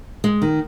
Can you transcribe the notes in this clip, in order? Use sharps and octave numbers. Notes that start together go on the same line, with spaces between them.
G#3
D#3